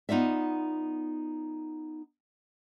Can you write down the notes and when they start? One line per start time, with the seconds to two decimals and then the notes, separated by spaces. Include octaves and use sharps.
0.09 B3 D#4 F4 D5 E5